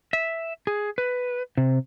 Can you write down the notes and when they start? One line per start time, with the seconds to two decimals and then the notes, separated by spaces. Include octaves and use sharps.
0.13 E5
0.67 G#4
0.98 B4
1.57 C3